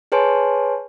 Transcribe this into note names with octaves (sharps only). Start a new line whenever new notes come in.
G#4 B4 C#5 G#5 A5 C6